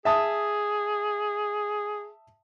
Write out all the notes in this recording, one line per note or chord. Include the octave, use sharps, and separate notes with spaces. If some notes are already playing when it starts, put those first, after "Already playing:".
G#4 E5 A5 D#6